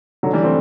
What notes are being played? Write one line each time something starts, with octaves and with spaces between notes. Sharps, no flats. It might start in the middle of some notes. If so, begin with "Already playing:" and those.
D3 F#3
E3 G3
A3 C4